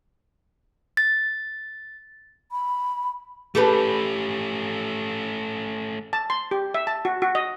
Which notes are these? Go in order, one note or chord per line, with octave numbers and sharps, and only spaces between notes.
A6
B5
A3 C#4 G4 A4 B4
A5
C6
G4
E5
A5
F#4
F#4
D#5